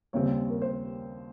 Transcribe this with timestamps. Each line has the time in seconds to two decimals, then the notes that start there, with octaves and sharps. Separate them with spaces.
0.13 D#2 C#3 G3 C4 C#5
0.50 A#4
0.62 C5